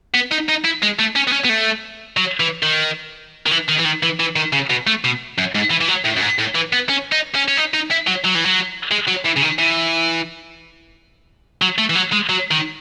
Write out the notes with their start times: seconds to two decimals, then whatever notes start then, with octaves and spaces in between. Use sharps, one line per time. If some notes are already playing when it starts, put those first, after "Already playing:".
0.14 B3
0.32 D#4
0.49 D#4
0.65 E4
0.83 G#3
0.99 A3
1.16 C#4
1.27 B3
1.32 C#4
1.45 B3
1.49 A3
2.17 F#3
2.40 E3
2.63 D#3
3.46 D#3
3.51 E3
3.69 D#3
3.79 E3
3.85 D#3
4.03 E3
4.20 E3
4.36 D#3
4.53 C#3
4.70 B2
4.87 A3
5.04 B2
5.38 F#2
5.55 G#2
5.71 E3
5.81 E3
5.88 F#3
6.05 A2
6.17 F#2
6.22 G#2
6.39 A2
6.55 E3
6.73 B3
6.89 C#4
7.12 D#4
7.35 C#4
7.48 C#4
7.57 D#4
7.74 D#4
7.91 E4
8.07 F#3
8.25 F#3
8.36 E3
8.45 F#3
8.91 G#3
9.08 F#3
9.26 E3
9.37 C#3
9.43 D#3
9.59 E3
11.62 F#3
11.78 A3
11.90 E3
11.95 F#3
12.12 G#3
12.29 F#3
12.51 D#3